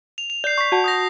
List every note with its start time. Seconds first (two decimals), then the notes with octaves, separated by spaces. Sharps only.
0.18 F7
0.30 F7
0.44 D5 G6 C7
0.58 C#6 B6
0.72 F#4 F#5 A5
0.84 D#6 G6 A#6